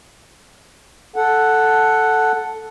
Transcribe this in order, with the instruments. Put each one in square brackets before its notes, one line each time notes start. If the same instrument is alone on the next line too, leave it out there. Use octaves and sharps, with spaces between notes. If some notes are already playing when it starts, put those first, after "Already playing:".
[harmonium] A4 F#5